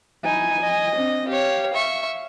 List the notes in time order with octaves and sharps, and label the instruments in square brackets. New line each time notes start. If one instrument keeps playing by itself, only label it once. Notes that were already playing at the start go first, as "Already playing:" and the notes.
[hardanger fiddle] D#4 E4 [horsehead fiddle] G#5
[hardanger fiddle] D#5
[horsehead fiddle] C4 D4
[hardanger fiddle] G4 C#5 [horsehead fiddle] F5
[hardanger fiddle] E5 C#6